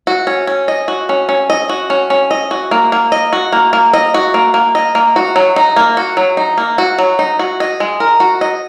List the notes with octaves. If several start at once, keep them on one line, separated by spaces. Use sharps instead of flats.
F#4
C#4
C#4
D#5
F#4
C#4
C#4
D#5
F#4
C#4
C#4
D#5
F#4
A#3
A#3
D#5
F#4
A#3
A#3
D#5
F#4
A#3
A#3
D#5
A#3
F#4
F#3
D#4
A#3
F#4
F#3
D#4
A#3
F#4
F#3
D#4
F#4
D#5
G#3
A#4
F#4
D#5